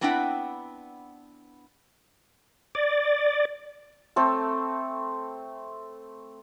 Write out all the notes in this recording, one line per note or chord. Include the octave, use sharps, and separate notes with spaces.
B3 C4 D4 E4 F#5 G5
D5
A3 C4 A4